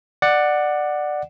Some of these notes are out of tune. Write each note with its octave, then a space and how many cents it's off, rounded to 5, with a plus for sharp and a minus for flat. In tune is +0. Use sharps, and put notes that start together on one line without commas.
D5 +15 F#5 +0